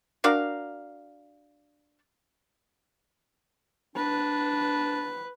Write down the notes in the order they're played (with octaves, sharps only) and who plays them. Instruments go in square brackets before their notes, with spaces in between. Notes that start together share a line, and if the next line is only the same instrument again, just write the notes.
[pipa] D4 F#4 A#4 F5
[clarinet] D4 [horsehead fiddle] B4